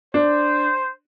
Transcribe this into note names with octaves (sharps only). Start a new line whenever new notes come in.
D4 C5